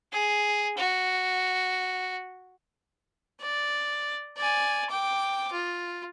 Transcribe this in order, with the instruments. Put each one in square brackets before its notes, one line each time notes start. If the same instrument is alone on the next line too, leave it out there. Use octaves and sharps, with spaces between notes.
[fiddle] G#4
F#4
[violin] D5
D5 G#5
G5 D6
F4